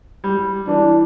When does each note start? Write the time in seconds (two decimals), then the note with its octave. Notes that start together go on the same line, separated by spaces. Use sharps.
0.24 G3
0.67 E3 D4